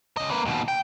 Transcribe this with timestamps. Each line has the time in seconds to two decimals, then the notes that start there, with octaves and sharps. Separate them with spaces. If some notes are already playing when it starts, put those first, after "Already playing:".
0.17 C#3 D#5
0.30 A#3 B4
0.45 D#2 B2
0.68 G5